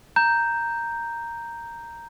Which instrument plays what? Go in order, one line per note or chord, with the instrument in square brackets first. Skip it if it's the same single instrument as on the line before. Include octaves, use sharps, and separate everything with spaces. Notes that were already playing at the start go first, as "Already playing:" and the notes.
[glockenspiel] A#5 G6